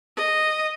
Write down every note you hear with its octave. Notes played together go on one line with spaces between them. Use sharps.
D#5